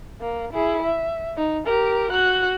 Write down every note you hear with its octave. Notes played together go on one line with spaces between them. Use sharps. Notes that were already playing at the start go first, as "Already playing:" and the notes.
A#3
E4 G#4
E5
D#4
G4 A#4
F#4 F#6